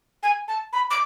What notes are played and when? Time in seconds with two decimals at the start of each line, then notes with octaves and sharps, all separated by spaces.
0.23 G#5
0.48 A5
0.73 B5
0.90 D6